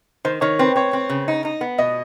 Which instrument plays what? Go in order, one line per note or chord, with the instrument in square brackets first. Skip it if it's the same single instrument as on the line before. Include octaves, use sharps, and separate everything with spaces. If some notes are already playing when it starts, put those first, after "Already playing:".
[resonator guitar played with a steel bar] D#3 [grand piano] C5
[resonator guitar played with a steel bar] D#3 [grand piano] C#5
[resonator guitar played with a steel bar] C4 [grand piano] B4
[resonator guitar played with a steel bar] C4 [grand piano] C#5
[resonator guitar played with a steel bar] C4
C#3
D#4
D#4
B3
[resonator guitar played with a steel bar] B2 [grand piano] D#5